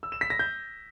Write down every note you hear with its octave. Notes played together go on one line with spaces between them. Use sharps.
E6
E7
B6
A#6
G6